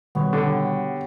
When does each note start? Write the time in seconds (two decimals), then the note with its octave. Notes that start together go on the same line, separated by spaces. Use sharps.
0.15 B2 D#3 G3 B3 C#5
0.33 D3 G4 G5